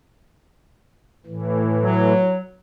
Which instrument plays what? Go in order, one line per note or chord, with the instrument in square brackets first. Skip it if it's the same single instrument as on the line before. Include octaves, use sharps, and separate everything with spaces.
[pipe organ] A2 E3
[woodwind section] F#3